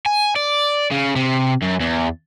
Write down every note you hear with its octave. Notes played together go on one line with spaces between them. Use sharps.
G#5
D5
C#3
C3
F#2
E2